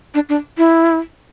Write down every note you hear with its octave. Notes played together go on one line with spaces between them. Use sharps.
D4
D4
E4